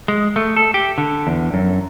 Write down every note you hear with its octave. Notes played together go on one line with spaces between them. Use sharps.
G#3
A3
A4
G4
D3
E2
F#2